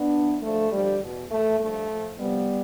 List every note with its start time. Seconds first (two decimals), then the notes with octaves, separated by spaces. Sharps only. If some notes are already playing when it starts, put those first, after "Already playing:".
Already playing: B3 D4
0.13 F2 E3
0.42 D2 D3 F3 A3
0.72 D2 D3 F3 G3
1.00 E2 B2
1.30 A2 E3 A3
1.60 G2 F3 A3
1.90 A2 F3
2.19 D2 C3 F3 G3 B3